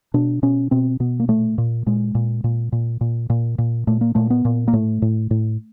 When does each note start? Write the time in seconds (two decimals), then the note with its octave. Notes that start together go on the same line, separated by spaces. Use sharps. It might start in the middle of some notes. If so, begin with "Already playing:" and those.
0.14 B2 D4
0.43 B2 C#4
0.71 B2 C4
1.00 B2 B3
1.20 A#3
1.28 A#2 A3
1.58 A#2
1.86 A#2 G#3
2.15 A#2
2.44 A#2
2.72 A#2
3.01 A#2
3.30 A#2
3.58 A#2
3.87 A#2 A3
4.01 A#3
4.15 A#2 A3
4.30 B3
4.45 A#2
4.68 A#3
4.73 A2 A3
5.02 A2
5.31 A2